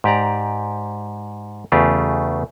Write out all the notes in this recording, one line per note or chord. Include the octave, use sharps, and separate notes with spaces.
G#2 G4 D5 A#5
E2 C#3 A3 F4 G4 G#4